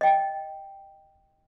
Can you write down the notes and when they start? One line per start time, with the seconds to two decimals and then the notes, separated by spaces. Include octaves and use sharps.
0.01 D#5 G5